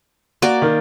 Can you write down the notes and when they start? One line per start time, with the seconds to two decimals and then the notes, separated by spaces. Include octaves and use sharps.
0.42 A#3 F#4 D5
0.62 D#3